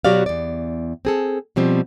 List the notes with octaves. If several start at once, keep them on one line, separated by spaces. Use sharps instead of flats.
B2 F#3 F#4 G4 D5 F5
E2 D5
C4 G#4 A4
B2 F3 G3 C4